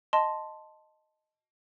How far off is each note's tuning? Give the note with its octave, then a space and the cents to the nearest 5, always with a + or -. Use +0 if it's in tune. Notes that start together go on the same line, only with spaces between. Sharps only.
D#5 +0 A5 +0 C6 +0